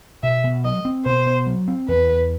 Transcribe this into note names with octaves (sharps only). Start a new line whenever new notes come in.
B2 E5
B2
F#3 D#5
C4
B2 C5
B2
F#3
C4
E2 B4
E2